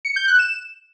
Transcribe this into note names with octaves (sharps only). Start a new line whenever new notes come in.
C#7
G6
F#6
E7